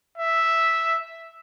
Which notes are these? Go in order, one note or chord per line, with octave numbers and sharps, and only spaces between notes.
E5